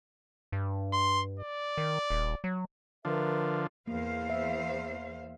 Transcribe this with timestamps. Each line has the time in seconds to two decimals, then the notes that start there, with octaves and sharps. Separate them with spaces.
0.52 G2
0.93 C6
1.39 D5
1.77 D#3
2.10 D#1
2.44 F#3
3.05 D3 F3 A#4 B4 E5
3.88 E2 A#3 C5 F5
4.30 E5